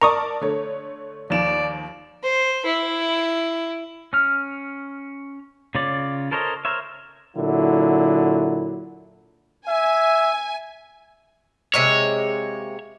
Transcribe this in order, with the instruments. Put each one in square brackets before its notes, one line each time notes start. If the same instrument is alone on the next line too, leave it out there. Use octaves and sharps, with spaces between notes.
[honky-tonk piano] A#4 D5 A5 [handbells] A#5 C#6 D#6
[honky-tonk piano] D3 A3 C#5
[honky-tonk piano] D#2 F3 E7 [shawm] D5
[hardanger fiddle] C5
E4
[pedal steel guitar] C#4 F6
C#3 F4 C#5 D5
A4 A#4 C5 C#5 D#5
A#4 C5 C#5 E5
[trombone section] A#2 D3 F#3 E4
[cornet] E5 [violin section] G#5
[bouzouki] C3 G#3 A#3 [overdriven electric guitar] C#5